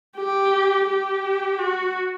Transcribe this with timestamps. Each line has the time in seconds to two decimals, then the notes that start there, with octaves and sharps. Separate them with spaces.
0.17 G4
0.87 G4
1.59 F#4